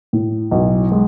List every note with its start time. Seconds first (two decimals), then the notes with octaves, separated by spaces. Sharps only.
0.13 A2
0.51 B1
0.92 G#3